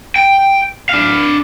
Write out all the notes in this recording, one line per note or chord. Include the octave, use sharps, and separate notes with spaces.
G5
D4 F5